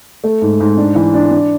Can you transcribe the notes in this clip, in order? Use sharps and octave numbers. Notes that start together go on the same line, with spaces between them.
A3
G#2
G#2
D4
E3
D4
D4